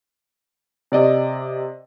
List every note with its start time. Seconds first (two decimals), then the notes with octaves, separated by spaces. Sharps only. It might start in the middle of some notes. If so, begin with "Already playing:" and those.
0.92 C3 D5 D#5